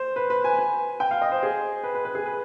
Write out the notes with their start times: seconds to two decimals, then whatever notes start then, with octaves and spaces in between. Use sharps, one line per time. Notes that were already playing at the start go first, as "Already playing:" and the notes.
Already playing: C5
0.16 B4
0.30 B4
0.44 G#5
0.58 G#5
1.00 G5
1.11 F5
1.22 D#5
1.32 C5
1.43 G#4
1.83 B4
1.95 B4
2.05 B4
2.15 G#4
2.26 B4